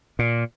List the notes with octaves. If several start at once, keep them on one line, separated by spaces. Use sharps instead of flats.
A#2